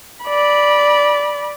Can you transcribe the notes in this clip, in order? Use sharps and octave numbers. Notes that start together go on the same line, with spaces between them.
D5 B5